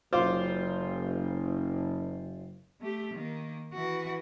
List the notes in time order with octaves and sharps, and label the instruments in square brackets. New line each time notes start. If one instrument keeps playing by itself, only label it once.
[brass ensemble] F#1 [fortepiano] F4 C5 D6
[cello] A3 G4
D#3 A#3
E3 F#4